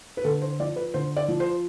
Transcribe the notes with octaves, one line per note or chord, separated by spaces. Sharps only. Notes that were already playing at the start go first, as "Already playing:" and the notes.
B4
D3 A4
C5
F3 D5
B4
D3 C5
D5
F3
C5